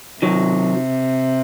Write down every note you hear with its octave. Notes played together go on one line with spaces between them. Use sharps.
C3 D#3 F#3